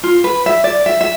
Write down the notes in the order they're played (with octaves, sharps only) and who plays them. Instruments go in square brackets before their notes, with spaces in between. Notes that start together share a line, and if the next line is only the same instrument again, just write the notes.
[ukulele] F4
B4
E5
D5
E5
E5